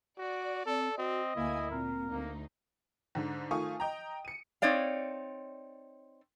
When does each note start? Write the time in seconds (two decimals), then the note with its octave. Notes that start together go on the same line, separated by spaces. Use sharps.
0.18 F#4 D5
0.66 C4 A4
0.98 C4 F#4 D#5
1.36 D2 A#3 E4 F5 G#5
1.71 A#2 C4 A#4
2.10 D2 A#3 D#4
3.15 G#2 D3
3.51 D#3 A3 F4 G#5 C#6 D#6
3.80 D#5 G5 A#5
4.25 C#7 D#7
4.62 C4 D#4 C#5 D5 F5